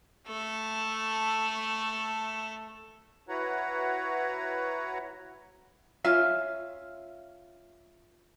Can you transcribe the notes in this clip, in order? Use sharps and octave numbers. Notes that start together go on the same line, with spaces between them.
A3 A4
E4 F#4 B4 C#5 F#5 A#5
C#4 F4 E5 F5